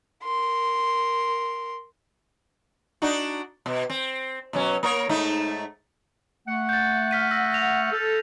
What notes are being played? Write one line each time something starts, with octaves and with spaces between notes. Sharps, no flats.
A#4 C6
D4 D#4 F#4
B2
C4
B2 F#3 C#4
A#3 A#4 C#5
G#2 A3 D#4
A3 F#5
G6 A6
F6 B6 D#7
E6 A#6
E6 A#6 F7
A4